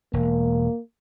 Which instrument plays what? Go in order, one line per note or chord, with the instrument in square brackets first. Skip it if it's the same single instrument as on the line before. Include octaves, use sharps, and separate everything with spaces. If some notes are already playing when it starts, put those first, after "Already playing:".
[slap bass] E1 [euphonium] A#3